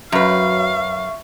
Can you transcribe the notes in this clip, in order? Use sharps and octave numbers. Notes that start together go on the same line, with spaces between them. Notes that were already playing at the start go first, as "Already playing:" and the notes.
F#2 F#3 B4 E5 F5 C#6